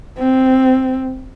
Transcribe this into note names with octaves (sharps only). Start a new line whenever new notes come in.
C4